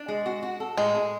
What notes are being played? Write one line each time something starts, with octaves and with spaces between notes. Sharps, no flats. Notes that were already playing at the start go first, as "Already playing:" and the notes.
Already playing: D4
G#3
F#4
F#4
A4
A2 G#3
G#4